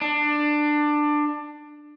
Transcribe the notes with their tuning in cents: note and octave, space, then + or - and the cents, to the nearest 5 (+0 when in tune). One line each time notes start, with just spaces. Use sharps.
D4 +15